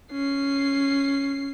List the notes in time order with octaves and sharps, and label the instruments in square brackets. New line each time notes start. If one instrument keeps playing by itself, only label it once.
[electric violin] C#4 C7